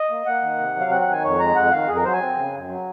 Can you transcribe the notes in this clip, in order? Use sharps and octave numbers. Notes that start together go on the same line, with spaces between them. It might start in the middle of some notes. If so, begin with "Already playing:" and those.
Already playing: D#5
A#3
A#3 F#5
D#3
C3
F#3
F5
C4 F#5
F#5
D#3 G#5
F2 C#5
G#3 A#5
F2 F#5
D#3 F5
F2 G#4
A#4
F#3 C5
G#5
C4
C#3
F#2
F#3